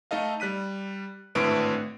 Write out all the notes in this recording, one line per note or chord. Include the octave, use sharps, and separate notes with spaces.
A3 D#4 A4 D#5 F5
G3 F#6 B6 D#7
G#1 A2 D3 A3 B4 D7